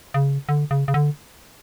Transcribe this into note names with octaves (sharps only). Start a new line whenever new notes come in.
C#3
D3
C#3
C#3
D3